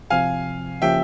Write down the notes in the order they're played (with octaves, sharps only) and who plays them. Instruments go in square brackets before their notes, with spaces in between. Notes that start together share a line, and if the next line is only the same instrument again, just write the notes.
[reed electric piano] C3 F3 C4 [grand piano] F5 G#5
[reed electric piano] C#3 F3 A#3 C#4 G4 [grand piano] E5 G5